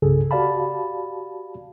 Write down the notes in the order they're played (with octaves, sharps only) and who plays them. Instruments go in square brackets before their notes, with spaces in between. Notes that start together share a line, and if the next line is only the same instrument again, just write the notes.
[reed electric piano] C2 G2 C#3 G#4 A4
F#4 G4 D5 F5 A5 B5